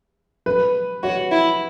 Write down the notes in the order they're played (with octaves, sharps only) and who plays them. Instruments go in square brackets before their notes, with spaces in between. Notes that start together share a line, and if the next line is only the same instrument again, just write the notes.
[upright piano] B4
[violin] F#4 [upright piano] C#5
[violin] E4